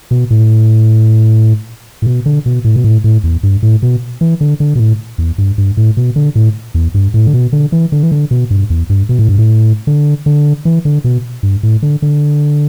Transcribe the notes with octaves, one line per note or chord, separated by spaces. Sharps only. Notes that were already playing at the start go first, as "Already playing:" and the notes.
B2
A2
A2
B2
D3
B2
A2
B2
A2
A2
E2
G2
A2
B2
E3
D3
D3
B2
A2
E2
G2
G2
A2
B2
D3
A2
E2
G2
A2
D3
B2
D3
E3
D3
E3
D3
B2
G2
E2
G2
B2
A2
G2
A2
D3
D3
E3
D3
B2
G2
A2
D3
D3